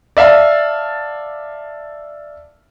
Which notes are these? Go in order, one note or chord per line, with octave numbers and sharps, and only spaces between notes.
D5 E5 F5 A5